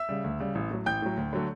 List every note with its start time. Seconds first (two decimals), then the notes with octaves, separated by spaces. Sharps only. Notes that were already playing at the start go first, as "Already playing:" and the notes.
Already playing: E5 E6
0.09 C#3 G3
0.24 D2
0.40 C#3 G3
0.55 A1
0.71 A2 F#3
0.86 A1 G5 G6
1.02 A2 F#3
1.17 D2
1.33 D3 F#3 A3